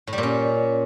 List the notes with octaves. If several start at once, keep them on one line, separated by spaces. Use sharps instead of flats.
A2
G3
A#2
C#4